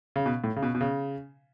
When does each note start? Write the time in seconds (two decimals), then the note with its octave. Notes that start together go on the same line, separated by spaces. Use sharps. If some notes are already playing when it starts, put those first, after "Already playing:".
0.16 C#3
0.26 B2
0.44 A2
0.56 C#3
0.62 B2
0.75 B2
0.81 C#3